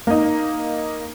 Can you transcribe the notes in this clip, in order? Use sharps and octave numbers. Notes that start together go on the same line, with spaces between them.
A#3 D#4